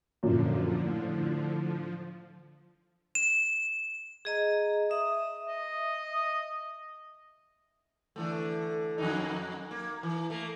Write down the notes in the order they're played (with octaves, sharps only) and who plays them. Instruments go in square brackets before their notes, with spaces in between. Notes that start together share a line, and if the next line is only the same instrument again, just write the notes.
[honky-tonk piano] F#2 A#2 [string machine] D3 F3
[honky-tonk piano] A2
[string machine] F3
[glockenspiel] E7
[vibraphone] G#4 D#5 A#5
[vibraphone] E5 [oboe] D#6
[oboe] D#5
[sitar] D3 E3 A3
F2 D#3 D#4
A#3
E3
A3 A#3